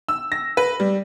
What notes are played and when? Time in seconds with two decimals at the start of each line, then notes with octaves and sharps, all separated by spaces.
0.08 E6
0.32 A#6
0.57 B4
0.80 G3